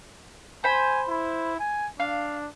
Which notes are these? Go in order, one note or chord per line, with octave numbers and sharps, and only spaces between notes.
C5 G#5 B5
E4
G#5
D4 F5